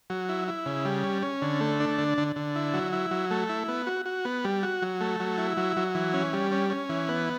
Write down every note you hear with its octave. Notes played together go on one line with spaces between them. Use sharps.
F#3
E4
E4
C#3
G3
C#4
C#4
D3
A3
D4
D3
D3
D3
E4
F#3
E4
F#3
A3
E4
B3
F#4
F#4
B3
G3
F#4
F#3
A3
F#3
E4
F#3
F#3
E3
C#4
G3
C#4
C#4
E3
B3